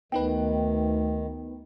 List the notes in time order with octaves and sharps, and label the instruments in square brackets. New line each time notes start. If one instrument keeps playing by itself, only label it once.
[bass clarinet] D2 [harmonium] D#3 [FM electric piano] B3 D#4 B4 [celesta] G5